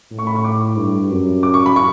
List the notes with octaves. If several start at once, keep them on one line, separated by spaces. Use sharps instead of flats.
A2
C#6
B5
C#6
D6
G2
F#2
D6
C#6
B5
C#6